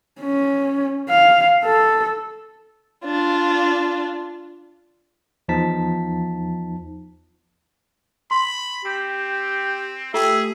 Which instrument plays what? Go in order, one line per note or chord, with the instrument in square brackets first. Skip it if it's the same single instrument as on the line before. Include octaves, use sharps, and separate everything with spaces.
[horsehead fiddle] C#4
F5
A4
[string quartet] D4 F4
[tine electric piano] E2 F3 D#4 A5 B6
[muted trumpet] B5 [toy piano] C6
[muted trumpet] C4 [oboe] G4
[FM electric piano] A3 G4 [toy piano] F4 [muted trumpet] G#4 [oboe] E5